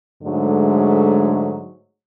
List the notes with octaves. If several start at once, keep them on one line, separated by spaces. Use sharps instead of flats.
G#2 D3 F#3 G#3 A3